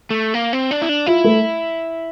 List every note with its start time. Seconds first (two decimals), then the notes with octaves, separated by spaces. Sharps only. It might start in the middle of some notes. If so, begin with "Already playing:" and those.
0.11 A3
0.34 A#3
0.53 C4
0.71 D4
0.82 E4
0.89 D4
1.06 E4 F4
1.24 A3